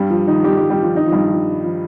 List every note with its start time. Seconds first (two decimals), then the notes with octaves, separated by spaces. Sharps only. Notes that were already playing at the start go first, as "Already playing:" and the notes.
Already playing: G2 G3
0.10 F3
0.27 D#3 D#4
0.44 G3 G4
0.57 G3 G4
0.70 G3 G4
0.82 F3 F4
0.95 D#3 D#4
1.06 F3
1.12 G2 G3
1.30 F3
1.64 F3